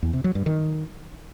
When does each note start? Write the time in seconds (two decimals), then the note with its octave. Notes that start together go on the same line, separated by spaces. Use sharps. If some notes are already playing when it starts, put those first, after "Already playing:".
0.03 E2
0.13 C3
0.24 F#3
0.35 G2
0.46 D#3